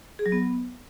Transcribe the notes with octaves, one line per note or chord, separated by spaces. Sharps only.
G#4
F#3
B3